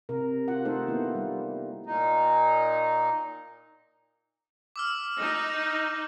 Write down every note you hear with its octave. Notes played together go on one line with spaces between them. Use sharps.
C3 A#4
F4 F#5
A3 D#4 A4 C5
A#3 B3 E4
G3
A#2 D#4
D6 E6 F6
D#4